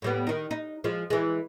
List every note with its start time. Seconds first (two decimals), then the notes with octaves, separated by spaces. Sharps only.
0.02 A2 G3 B3
0.27 D#3 D#4
0.51 D#4
0.84 F3 G#3
1.10 E3 G#3